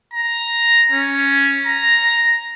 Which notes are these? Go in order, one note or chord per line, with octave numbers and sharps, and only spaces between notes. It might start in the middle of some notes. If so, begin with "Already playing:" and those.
A#5
C#4
A#5